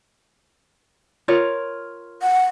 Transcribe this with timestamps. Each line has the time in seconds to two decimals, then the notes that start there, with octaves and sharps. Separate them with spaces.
1.28 F4 A#4 C#5
2.23 F#5